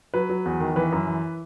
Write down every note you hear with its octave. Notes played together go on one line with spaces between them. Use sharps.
F#3 B4
F#3
E2
D#3
E3 B4
F#2
E3